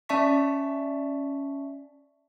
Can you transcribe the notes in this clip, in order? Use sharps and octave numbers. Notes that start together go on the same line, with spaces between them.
C#4 D5 E5 A5 C#6 B6